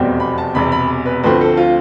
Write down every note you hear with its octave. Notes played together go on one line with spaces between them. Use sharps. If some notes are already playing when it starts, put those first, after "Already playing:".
Already playing: F1 E2 B2 G3 C4
B5
A5
E1 E2 C3 B5
B5
B4
D2 D3 F3 A3 C4 B4
A4
F4